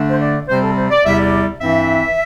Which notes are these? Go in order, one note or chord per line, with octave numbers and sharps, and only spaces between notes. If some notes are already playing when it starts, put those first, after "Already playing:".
Already playing: D3 A3 D4
C5
D5
C3 G3 C4 C5
A4
C5
D5
E2 C3 G3 E4 E5
D5
G2 E3 C4 E4 E5